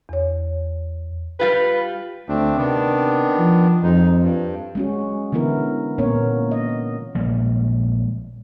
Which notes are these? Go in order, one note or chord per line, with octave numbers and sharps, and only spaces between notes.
E2 C#5
G3 F4 G4 B4
D2 A3 C4 D4
C3 D#3 B3 D4
F3
F2 G#3 D#4
G2
G#3 C#4 F#4
D3 E3 B3 E4 A#4
A#2 A#3 B3 C#4 A#4 C#5
D#5
A#1 A#2 G3 G#3